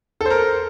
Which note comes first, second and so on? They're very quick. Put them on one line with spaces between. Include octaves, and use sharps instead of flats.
A4 C5 A#4